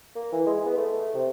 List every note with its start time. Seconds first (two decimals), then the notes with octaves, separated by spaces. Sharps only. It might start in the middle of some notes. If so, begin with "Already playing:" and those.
0.16 A#3
0.33 E3
0.47 G#3
0.65 B3
0.77 A3
1.15 C3